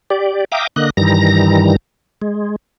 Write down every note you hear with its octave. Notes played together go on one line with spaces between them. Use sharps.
G4 D5
E5 F5 G5 A#5 D6 D#6
D3 A#3 D#5 F#6
G2 D#3 E3 G3 A#5 A#6
G#3